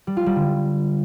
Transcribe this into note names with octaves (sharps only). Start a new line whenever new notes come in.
G3
F4
G3
D3